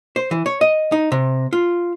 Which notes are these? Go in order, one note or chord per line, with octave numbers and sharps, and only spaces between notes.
C5
E3
C#5
D#5
D#4
C3
F4